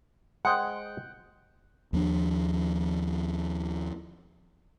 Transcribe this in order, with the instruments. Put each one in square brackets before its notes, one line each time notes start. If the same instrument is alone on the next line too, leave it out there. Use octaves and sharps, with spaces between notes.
[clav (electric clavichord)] G#3 G#4 C5 [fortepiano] F#5 G5
[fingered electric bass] D#2 F3 D4